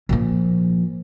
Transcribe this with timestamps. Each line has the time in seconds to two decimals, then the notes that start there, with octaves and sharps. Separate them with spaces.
0.09 A#2 F3